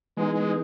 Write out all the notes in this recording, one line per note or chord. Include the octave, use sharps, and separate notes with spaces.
E3 G#3 B3 D#4 G#4
G#3